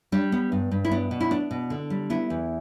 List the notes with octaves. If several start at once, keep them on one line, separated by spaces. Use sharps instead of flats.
G3 D4
B3
G2
G2
E4
B3 D4
B2
E4
B3 D4
B2
D3
G3
B3 E4
E2